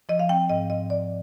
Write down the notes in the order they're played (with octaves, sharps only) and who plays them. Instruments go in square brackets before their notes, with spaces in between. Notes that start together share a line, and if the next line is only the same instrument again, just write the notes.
[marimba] F3 D#5
F5
C4 G5
G#2 D#5
G#2 D#5
F3 D5